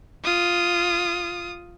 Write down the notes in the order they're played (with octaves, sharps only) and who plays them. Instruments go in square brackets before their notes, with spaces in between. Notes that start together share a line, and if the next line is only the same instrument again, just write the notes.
[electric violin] F4 D#6